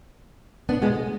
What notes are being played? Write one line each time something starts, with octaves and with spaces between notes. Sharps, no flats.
B3 D4
G#3 B3